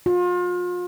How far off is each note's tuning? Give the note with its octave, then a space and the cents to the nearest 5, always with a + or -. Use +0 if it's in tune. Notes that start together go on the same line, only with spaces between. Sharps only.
F4 +35